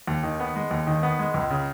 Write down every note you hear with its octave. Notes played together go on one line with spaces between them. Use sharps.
D#2
D#3
B3
G#3
D#2
D#3
B3
G#3
C#2
C#3